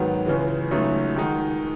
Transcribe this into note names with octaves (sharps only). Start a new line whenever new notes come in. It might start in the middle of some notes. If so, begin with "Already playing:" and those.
Already playing: G#2 D#3 F#3 B3
C#2 C#3 E3 G#3
C#2 C#3 F#3 A3 D#4
D#3 G#3 D#4 F#4